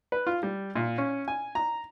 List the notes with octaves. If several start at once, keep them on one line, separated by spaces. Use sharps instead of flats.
B4
F4
G3
A#2
C#4
G#5
A#5